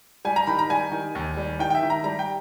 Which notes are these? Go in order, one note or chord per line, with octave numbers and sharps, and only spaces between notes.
G3 G#5
A#5
D#3 B5
A#5
G3 G#5
D#3
D#2
G3
D#3 G5
G5
E5
D#3
A#5
G3 A#5
G5